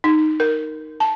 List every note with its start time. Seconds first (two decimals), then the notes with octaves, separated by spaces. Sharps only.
0.04 D#4
0.40 A#4
1.00 A5